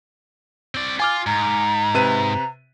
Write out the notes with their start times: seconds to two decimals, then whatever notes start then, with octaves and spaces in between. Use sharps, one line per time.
0.75 C4 D5
1.00 F4 G#5 D6 F6
1.27 G#2 A#5
1.94 C3 B4 D#7